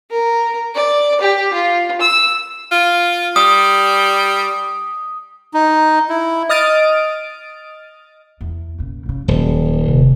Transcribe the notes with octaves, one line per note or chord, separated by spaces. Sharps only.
A#4
D5
G4
F4
E6
F4
G3 D#6
D#4
E4
D#5 D#6 F6 A6 D7
E2 B3
A#2 C#3
F#1 C#3
D#1 F#3 G3
E1 C3